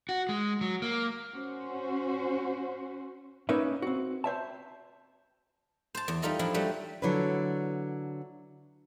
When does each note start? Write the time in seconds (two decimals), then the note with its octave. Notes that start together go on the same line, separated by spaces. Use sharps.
0.09 F#4
0.29 G#3
0.61 F#3
0.82 A#3
1.32 C#4 F#4 C5
3.49 A#3 C#4 D#4 A#4 B4 E5
3.82 C4 F#4
4.24 C5 C#5 E5 A5
5.95 C5 A5
6.08 E2
6.22 G3 D#4 F4 A4 D#5
6.39 F3 D4 E4
6.54 F#3 G3 A3
7.02 D3 F#3 D4 E4 B4